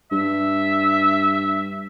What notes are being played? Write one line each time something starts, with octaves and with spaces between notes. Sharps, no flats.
G2 E5